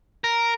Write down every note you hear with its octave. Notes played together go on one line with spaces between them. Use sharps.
A#4